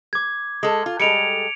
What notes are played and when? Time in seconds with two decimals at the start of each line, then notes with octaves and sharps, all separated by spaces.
0.13 D6 G#6
0.63 G#3 A4
0.86 F4
1.00 G3 G#3 A4 C#7 D7 F7